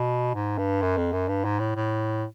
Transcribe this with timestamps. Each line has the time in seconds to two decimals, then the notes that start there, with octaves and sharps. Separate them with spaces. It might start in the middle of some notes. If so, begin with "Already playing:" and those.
Already playing: B2
0.35 G#2
0.58 G2
0.82 F#2
0.97 F2
1.13 F#2
1.29 G2
1.45 G#2
1.60 A2
1.76 A2